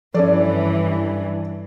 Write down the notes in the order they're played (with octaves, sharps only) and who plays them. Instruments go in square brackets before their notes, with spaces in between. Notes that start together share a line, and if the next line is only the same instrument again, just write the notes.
[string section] G2 E3 [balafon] F3 [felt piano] C#4 A4 D5